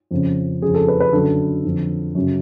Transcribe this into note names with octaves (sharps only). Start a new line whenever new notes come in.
F2 C#3
F2 C#3 G#4
A4
B4
B4
F#2 D3 A4
F2 D3
F#2 C#3